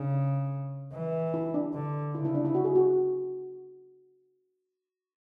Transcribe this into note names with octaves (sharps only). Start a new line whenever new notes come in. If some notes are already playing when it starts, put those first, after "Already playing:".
Already playing: C#3 D4
E3
E4
D4
D3
C#3 E4
E4
D4
E4
F#4
G#4
F#4